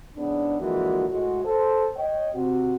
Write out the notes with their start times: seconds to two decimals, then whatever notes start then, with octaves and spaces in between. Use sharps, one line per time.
0.16 E2 G#2 C#3 B3 D4
0.59 D3 E3 F3 G#3 A#3 F#4
1.08 A2 G#3 F#4
1.44 A4 C5
1.96 C#5 D#5 G5
2.33 C3 C4 F#4